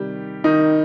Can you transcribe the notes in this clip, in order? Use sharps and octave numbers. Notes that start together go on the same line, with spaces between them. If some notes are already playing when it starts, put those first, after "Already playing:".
Already playing: C3 D#3 G3 G4
D#3 D#4